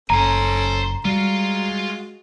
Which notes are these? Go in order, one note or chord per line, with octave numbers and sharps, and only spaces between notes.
F#1 C#4 A4 C5 G#5 A#5
G3 G#3 F4 F#4 F5